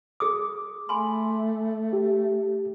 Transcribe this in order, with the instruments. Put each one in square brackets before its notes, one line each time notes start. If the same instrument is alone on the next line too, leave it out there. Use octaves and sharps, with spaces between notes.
[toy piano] G#4 D#6 [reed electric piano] D6
[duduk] A3 [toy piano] G#5 B5 C6
[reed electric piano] G4